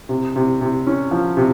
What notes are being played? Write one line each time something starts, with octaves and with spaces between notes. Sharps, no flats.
C3
C3
C3
C#4
F3
C3